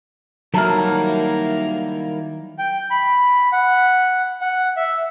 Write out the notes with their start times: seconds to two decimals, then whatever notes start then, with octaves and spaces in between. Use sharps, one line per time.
0.54 D#3 F#3 G3 A#3 E4 A4 A#4
2.59 G5
2.91 B5
3.52 F#5
4.41 F#5
4.77 E5